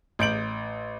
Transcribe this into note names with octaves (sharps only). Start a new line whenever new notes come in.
A1 G6 D7 F#7